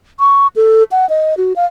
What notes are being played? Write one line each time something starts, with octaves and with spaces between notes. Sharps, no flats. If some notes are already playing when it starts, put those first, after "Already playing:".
C#6
A4
F#5
D#5
F#4
F5